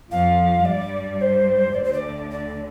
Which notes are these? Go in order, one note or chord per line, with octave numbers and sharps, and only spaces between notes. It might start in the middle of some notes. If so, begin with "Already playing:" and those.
F2 F3 F5
G2 G3 D5
C5
D2 D3 D5
C5
D5
D5